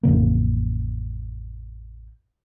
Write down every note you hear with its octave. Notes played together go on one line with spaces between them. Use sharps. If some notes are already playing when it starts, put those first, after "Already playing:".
A1 F2 C#3 A#3